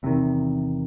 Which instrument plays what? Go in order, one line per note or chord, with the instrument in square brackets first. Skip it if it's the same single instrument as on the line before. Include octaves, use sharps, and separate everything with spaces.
[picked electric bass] E2 C3 D#3